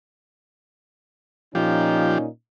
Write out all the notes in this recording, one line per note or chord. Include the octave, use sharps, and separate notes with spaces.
A#2 F3 C#4 D#4 G4